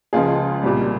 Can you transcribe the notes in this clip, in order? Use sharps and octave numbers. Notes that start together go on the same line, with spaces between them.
C#2 C#3 F3 G#3 F4 G#4
C2 A#2 G3